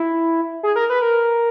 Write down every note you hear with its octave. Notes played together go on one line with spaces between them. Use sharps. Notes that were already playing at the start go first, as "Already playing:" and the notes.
Already playing: E4
G#4
A#4
B4
A#4